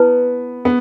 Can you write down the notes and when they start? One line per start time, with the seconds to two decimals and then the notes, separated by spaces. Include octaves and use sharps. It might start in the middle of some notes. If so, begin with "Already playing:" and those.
Already playing: B3 E4 B4 A5
0.65 B3